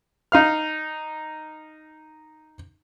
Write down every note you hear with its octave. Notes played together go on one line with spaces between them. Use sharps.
D#4 F5 F6